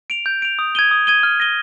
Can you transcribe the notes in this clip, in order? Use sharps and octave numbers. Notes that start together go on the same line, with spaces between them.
D7 F7
G6
D7 F7
D#6
G#6 D#7 G7
D#6
G#6 D#7 G7
F6
A#6 D#7 G7